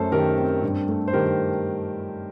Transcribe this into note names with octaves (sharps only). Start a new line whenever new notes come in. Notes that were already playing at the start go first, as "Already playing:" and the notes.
Already playing: F#2 A3 A4 C5
D#3 G4 A#4
C4
G2
A3
C5
D#3 G4 A#4